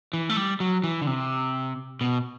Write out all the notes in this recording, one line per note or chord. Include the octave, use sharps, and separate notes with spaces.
E3
A3
G3
F#3
E3
D3
C3
B2